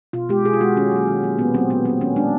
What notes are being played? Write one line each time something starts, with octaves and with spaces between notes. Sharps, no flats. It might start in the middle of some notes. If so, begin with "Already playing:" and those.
B2 F4
G#3 G4
B2 G#4
F4
G#3 F#4
D#3 C#4
F#3 A#3
D#3
F#3 A#3
A#2 B3
F#3 A#3 C4
A#2 B3
F#3 A#3 C4
D#3 C#4
G#3 D4